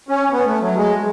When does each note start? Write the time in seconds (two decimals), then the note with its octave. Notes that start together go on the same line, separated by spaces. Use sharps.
0.09 C#4
0.32 B3
0.46 A3
0.62 F#3
0.77 G#3